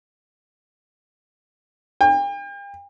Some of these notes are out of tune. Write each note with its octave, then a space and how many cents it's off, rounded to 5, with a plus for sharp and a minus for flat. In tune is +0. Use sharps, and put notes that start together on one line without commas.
G5 +40